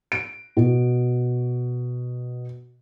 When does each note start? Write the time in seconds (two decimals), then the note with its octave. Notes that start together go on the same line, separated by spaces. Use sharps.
0.12 D7
0.57 B2